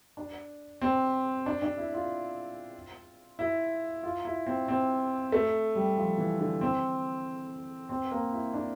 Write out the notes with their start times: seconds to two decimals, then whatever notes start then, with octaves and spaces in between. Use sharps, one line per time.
0.17 D4
0.82 C4
1.46 D4
1.62 D4
1.78 E4
1.94 F4
3.39 E4
4.03 F4
4.25 E4
4.47 C4
4.68 C4
5.32 A3
5.75 G3
5.97 F3
6.18 E3
6.39 D3
6.61 C4
7.89 C4
8.11 A#3
8.33 E4
8.54 D4